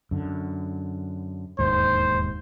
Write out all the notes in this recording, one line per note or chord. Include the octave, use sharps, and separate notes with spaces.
F#2 D3
E1 D#2 G#2 C5